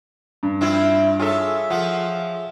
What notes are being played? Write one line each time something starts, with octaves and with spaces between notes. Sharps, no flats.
G2
C4 E4 F4
F4 G#4 A4 C#5 E5
F3 F4 F#5